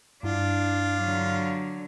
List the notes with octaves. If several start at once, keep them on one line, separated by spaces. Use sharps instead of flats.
G2 D4 E4 F4
D3 F#3